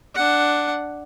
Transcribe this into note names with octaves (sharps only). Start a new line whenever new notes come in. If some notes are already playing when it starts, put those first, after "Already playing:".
D4 F#5